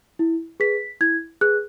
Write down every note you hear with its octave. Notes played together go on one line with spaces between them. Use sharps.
E4
G#4 B4 B6
E4 G#6
G#4 B4 F#6